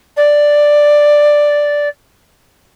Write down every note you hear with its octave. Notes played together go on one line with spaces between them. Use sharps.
D5